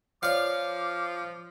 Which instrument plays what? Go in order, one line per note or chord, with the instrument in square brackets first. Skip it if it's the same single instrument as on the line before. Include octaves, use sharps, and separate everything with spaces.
[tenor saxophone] F3 [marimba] C#5 D5 [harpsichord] F5 [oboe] D6